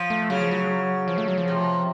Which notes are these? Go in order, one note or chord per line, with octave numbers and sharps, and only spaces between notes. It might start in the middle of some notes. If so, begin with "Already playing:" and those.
Already playing: F3
A3
C#3 F#3
F3
F#3
F3
A3
F#3
F3
C3